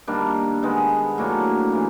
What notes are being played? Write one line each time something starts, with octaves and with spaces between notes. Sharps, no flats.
D#3 G3 A#3 D4
D#3 G#3 B3
A2 F#3 A#3 D4
C#3 E3